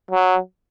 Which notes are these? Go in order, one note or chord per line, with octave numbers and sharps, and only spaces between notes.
F#3